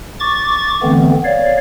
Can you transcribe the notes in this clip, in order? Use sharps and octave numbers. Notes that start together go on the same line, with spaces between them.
C#6 D6 A6
D3 E3 A3 B3 C4
C#5 D5 F5